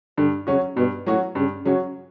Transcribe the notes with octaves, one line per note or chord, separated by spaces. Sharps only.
G2 D3
C#3 F#3 C#4 F#4
G2 B2
A2 F#3 C#4 F#4
G2 C#3
C#3 F#3 C#4 F#4